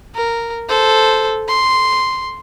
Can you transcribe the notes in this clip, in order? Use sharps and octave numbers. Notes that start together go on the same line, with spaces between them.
A#4
A4 C5
C6